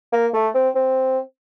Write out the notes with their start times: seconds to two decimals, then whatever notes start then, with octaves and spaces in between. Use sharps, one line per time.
0.13 A#3
0.34 A3
0.55 C4
0.75 C4